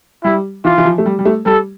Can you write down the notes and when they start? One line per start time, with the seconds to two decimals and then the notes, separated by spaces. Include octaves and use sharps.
0.24 G3 E4
0.65 E3 F4
0.78 E3
0.85 F3
0.98 A3
1.06 G3
1.19 G3
1.25 A3
1.46 G3 A4